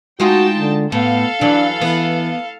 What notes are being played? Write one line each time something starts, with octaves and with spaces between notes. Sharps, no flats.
G#3 D#4 F4 F#4 G5 A5
D3
A2 B3 A4 F5
E3 F#3 D4
E3 B3